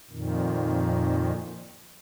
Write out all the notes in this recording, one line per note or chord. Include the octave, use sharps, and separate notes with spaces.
F2 A#2 D#3